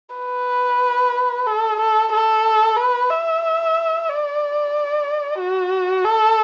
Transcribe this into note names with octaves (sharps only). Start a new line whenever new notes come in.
B4
A4
A4
A4
B4
E5
D5
F#4
A4